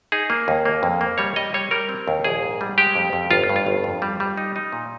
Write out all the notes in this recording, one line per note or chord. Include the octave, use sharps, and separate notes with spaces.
D#4 G#4
A#3
D#2
A#3
F2
A#3
G3 C#5
G3 D#5
G3 C#5
G3 A#4
C4
D#2
A#1 G#4
G#2
G3
G#3 G4
F2
F2
G1 F4
G2
F4
G1
F2
G3
G3
D#4
D#4
A#2